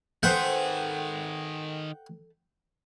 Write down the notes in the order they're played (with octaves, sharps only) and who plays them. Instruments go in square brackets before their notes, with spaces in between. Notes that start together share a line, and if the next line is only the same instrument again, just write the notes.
[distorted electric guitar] D#3 G#4 [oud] A4 B4 C5 [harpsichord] F#5 G5